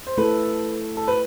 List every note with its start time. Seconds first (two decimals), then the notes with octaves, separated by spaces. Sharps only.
0.07 C5
0.18 A3 E4 A4 B4
0.97 A4
1.08 B4